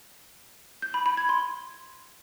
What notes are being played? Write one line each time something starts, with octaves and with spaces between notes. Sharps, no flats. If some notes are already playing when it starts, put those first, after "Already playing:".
G6
B5
B5
G#6
C6